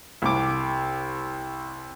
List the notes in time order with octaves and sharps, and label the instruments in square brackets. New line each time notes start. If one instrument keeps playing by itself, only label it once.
[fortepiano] C2 D6